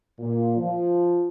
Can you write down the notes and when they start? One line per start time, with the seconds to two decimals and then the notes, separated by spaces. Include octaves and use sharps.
0.19 A#2
0.57 F3